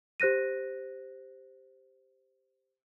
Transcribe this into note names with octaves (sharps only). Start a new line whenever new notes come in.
G4 C5 F#6 A#6 D#7